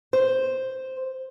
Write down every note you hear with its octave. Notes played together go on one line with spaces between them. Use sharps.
C5